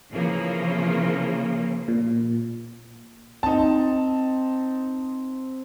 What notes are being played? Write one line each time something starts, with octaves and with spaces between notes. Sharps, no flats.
C#3 E3 F3 A#3
A#2
C4 D#4 A5